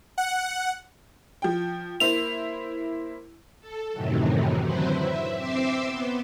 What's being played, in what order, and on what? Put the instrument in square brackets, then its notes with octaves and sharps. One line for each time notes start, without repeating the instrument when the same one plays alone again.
[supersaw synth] F#5
[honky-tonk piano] F3 G5
[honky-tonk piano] A#3 E4 C5 [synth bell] F7
[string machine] A4
F#2 A2 C3 D#3 E3 F#3
D3 F#3 C4 E4 B4 C5
E5
C4 E5 C6 D6 E6
B3